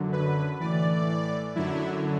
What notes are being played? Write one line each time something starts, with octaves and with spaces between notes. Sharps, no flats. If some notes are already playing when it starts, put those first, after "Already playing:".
Already playing: F#2 D3 F#3
B4
A2 E3 D5
F#2 D3 F#3 E4